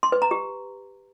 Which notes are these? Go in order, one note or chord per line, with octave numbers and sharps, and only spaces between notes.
C6
B4
A#5
G4